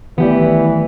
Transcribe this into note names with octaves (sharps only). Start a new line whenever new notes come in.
D#3 E3 F#3 A3 B3 G4 D5